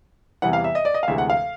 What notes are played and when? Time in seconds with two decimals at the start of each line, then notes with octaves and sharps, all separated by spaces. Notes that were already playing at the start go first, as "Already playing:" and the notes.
0.42 E2 C3 E3 G3 F#5
0.53 F5
0.64 E5
0.75 D#5
0.85 D5
0.94 D#5
1.03 F5
1.08 D2 C3 E3 G#3 E5
1.18 F#5
1.30 F5